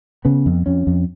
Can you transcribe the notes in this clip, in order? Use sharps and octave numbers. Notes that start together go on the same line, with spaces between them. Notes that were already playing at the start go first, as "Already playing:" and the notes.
C#3 B3
F2
F2 C#4
F2